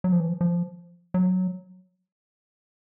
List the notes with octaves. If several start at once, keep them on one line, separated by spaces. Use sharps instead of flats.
F#3
F3
E3
F3
F3
F#3